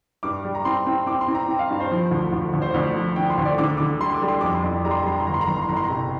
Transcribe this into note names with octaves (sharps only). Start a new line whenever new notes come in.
G2 D6
G3
A#5
C4 C6
C4
C4 D6
C6
C4
A#5
C4
F5
G2
C5
F3
D2
D2
D2
C5
D2 D5
F3
D3 G5
C6
D2
D5
D3 D6
D3 D6
G3 C6
D6
G3
C6
F2 D6
C6
F2
G3 A#5
C6
A#5
G3 C6
A#5
C6
G1 A#5
C6
A#5
G1 C6
A#5
C6
G1 A#5
C6
A#5
C3